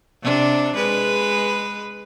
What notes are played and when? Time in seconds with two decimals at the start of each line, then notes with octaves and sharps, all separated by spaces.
0.23 C3 D4
0.75 G#3 B4